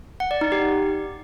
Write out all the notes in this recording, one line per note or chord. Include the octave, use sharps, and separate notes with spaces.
F#5
D5
D#4
G4